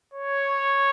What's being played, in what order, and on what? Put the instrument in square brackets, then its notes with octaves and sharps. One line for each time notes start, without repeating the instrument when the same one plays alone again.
[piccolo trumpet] C#5